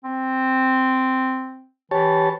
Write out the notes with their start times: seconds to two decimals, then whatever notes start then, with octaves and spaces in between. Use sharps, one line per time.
0.04 C4
1.91 E3 G4 C#5 A5